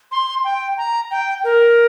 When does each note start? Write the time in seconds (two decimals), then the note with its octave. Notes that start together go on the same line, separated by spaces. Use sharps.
0.12 C6
0.44 G5
0.78 A#5
1.11 G5
1.44 A#4